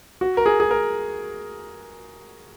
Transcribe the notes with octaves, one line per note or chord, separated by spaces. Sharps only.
F#4
A#4
G#4
G#4
A#4